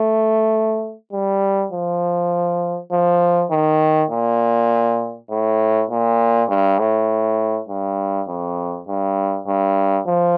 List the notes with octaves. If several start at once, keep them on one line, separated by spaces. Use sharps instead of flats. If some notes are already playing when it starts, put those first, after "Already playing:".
Already playing: A3
G3
F3
F3
D#3
A#2
A2
A#2
G2
A2
G2
F2
G2
G2
F3